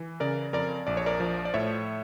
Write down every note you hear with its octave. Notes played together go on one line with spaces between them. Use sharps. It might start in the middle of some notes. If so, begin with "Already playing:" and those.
Already playing: E3
C#3 A#4 D5
F2 A#4 D5
A#1 D5
C#5
A#4 D5
F3
D5
A2 C#5 E5